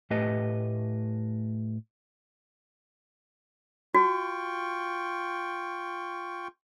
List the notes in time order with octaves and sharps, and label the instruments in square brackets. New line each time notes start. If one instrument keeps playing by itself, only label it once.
[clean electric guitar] A2 A3 G4 B4 D#5
[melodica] F4 G5 C#6 [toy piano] F#4